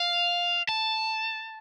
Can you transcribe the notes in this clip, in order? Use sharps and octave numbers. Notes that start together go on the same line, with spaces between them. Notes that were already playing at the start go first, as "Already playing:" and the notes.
Already playing: F5
A5